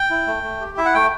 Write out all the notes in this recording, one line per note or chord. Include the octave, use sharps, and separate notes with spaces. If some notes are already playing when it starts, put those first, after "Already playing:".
Already playing: G5
E4
A3
A3
G4
E4 E5
F#5
A3 G5